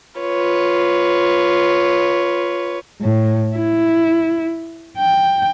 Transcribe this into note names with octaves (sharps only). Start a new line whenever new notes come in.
F4 B4 C#5
A2
E4
G5